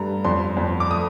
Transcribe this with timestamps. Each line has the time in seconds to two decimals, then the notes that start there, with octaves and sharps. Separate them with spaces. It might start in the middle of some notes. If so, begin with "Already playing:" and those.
Already playing: G2 A3 A#5
0.24 F2 C6
0.57 F2
0.80 D6
0.90 A3 D#6